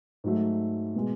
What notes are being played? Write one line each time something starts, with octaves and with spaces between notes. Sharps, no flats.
G#2 F#3 A3
B2 G#3